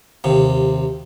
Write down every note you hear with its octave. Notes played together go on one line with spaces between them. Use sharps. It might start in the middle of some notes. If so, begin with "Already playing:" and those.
D#2 C3